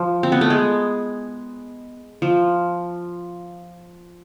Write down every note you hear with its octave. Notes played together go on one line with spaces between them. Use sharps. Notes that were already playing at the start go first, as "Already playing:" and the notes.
Already playing: F3
C4
B3
A3
G#3
F3